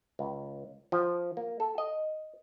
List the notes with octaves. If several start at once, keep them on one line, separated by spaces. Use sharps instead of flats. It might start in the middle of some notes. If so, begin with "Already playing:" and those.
C#2
F3
A#3
A4
D#5